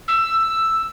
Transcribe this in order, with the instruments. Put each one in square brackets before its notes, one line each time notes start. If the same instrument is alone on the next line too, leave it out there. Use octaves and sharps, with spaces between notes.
[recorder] E6